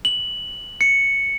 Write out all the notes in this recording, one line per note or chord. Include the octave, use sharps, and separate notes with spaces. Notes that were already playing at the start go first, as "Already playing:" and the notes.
F#7
C#7